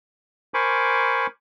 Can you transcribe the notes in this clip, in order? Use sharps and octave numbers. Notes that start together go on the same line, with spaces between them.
A#4 C5 G#5 B5 C#6 D6